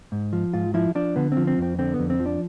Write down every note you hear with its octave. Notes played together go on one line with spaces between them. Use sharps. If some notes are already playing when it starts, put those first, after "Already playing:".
G#2
F3
G#2 F4
F3 E4
F3 D4
D3 B3
C4
F3
C4
F2 C4
D3 C4
B3
F2
C4
F3
D4